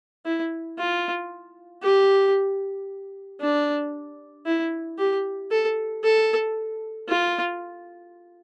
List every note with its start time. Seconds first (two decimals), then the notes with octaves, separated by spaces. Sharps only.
0.25 E4
0.79 F4
1.83 G4
3.41 D4
4.46 E4
4.99 G4
5.51 A4
6.04 A4
7.09 F4